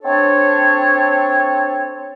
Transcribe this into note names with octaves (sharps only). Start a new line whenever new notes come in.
C4 D4 A4 C#5